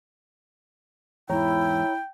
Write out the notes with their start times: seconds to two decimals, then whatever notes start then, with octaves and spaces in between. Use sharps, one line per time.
1.30 E2 G#2 E4 C#5 G5 A#5